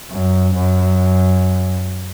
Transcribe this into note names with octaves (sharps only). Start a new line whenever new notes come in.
F#2
F#2